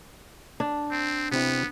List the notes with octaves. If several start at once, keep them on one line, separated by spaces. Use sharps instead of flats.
D4
C4
C3 B3 C4 E4